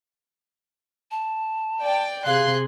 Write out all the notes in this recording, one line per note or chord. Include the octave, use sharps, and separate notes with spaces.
A5
D5 G5
C3 G#4 F5 C6 F#6